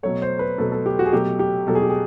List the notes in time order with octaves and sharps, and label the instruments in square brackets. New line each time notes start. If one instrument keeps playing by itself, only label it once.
[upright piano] B2 F#3 A3 [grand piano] C#5
[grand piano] C5
B4
[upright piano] B2 F#3 A3 [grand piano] A4
[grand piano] A4
G4
F#4
G#4
[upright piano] B2 F#3 A3 [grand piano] G4
[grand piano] G4
[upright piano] B2 F#3 A3 [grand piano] A4
[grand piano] G#4
G4
G#4